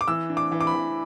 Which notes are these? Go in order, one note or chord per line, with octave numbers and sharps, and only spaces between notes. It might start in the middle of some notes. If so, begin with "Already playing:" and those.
D6
E3 E6
D4
D6
E3
D6
B5
E3